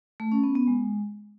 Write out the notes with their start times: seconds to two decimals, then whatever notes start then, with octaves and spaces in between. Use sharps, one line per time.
0.20 A3
0.32 C#4
0.44 B3
0.55 B3
0.67 G#3